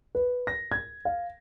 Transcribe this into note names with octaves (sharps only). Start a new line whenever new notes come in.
B4
A#6
G#6
F5